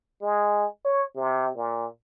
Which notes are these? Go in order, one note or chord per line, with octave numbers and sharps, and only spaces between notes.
G#3
C#5
C3
A#2